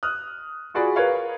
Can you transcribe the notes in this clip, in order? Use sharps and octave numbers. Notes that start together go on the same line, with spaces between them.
D#6 F6 F#6
F4 F#4 G#4 D5 B5
A#4 B4 C#5 F5